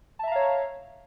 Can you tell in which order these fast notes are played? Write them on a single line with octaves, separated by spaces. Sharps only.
A5 E5 A#5 F5 C#5